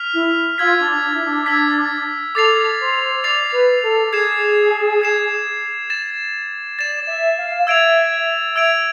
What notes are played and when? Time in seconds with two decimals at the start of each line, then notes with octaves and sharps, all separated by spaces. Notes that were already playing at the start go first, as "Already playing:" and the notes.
Already playing: F6 B6 F7
0.13 E4
0.58 F4 E6 G#6 B6
0.80 D4
1.02 D4
1.13 E4
1.24 D4
1.46 E6 G#6 B6
2.35 A4 D6 A6 C7 F7
2.79 C5
3.23 D5 D6 A6 C7 F7
3.53 B4
3.83 A4
4.12 G#4 G#6 C7 E7
5.02 G#6 C7 E7
5.90 A6 E7
6.79 D5 A6 E7
7.08 E5
7.38 F5
7.67 E5 E6 G#6 D7 F7
8.55 E5 E6 G#6 D7 F7